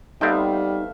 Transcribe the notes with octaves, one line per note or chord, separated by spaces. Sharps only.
G3 A3 B3 C4 D#4 E5 F5 G5